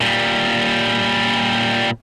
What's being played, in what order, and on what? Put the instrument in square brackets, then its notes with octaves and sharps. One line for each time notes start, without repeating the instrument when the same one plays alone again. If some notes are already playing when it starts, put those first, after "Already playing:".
[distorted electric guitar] A#2 G3